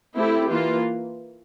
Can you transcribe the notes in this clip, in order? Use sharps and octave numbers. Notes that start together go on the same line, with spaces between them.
A3 C4 E4 G4
E3 A#3 F4